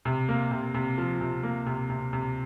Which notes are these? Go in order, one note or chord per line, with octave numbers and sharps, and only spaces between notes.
C3
A#3
C3
C3
F3
C3
A#3
C3
C3
C3